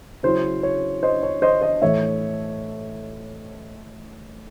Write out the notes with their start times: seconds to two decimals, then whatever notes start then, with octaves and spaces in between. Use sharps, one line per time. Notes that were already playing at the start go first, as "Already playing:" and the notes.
0.23 C#3 F#3 C#4 E4 C5
0.63 C#5
1.03 C5 D#5
1.23 C#5
1.42 C5 D#5
1.61 C5 D#5
1.81 A2 E3 A3 C#5 E5